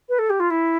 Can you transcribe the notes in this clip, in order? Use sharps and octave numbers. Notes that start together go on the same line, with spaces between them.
B4
A4
G4
F4
E4